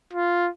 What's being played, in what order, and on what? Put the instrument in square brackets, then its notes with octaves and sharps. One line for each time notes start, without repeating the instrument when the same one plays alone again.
[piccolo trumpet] F4